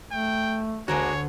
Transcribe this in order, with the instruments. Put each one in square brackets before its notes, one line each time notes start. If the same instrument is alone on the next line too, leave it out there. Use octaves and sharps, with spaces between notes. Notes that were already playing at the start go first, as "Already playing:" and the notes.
[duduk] A3 [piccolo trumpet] G5
[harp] D2 [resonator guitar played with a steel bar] G#3 A#3 F#4 [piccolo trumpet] C#5